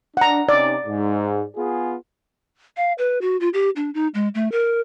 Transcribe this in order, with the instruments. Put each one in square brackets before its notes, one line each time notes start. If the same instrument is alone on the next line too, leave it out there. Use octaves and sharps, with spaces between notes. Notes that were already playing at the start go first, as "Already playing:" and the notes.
[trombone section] D4 [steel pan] F#5 A#5
[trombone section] C3 C#4 D#4 [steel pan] D5
[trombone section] G#2
B3 F4 G#4
[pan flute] F5
B4
F#4
F4
G4
D4
D#4
G#3
A3
A#4